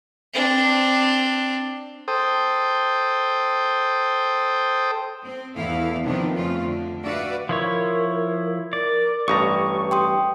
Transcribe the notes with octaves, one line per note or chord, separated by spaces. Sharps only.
C4 D4
A4 C5 G5 D#6
C4
E2 B3 E4 A4 F5
C3 D#3 F3 B3 C4 D4
F2 C#3 A3 F4
D3
F#4 B4 D5 E5 F5
F3 E4 A#4 C#5
A#4 D5
A1 G2 G4 A#5 C#6 D#6
G5 C6 D#6